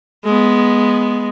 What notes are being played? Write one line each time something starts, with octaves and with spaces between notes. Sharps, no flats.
G#3 B3